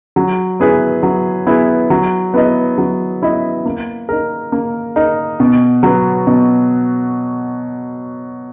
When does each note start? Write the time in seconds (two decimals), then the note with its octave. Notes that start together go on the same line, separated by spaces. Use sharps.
0.16 F#3
0.60 B3 E4 G#4 B4
1.03 F#3
1.47 B3 E4 G#4 B4
1.90 F#3
2.34 B3 E4 B4 D#5
2.78 F#3
3.22 B3 E4 B4 D#5
3.65 A#3
4.09 D#4 A#4
4.52 A#3
4.96 D#4 A#4
5.40 B2
5.83 F#3 B3
6.27 B2